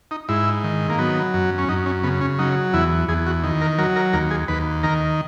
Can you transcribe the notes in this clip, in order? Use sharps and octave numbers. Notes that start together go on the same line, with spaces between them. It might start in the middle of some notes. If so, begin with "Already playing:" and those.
D#4
G#2 E4
D#3
A#3
F#3 B3
F#2
C#4
F#2 D#4
C#4
C#3 B3
C#4
F#3 D#4
E2 E4
E2 G#4
F#4
D#3
A#4
F#3 A#4
A#4
D#2 A#4
G#4
D#2 B4
D#3 A#4